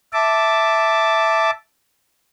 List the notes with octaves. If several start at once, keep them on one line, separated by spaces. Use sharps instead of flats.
E5 A5 D6